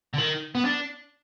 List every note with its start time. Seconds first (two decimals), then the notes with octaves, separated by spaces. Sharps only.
0.14 D3
0.18 D#3
0.55 B3
0.65 D4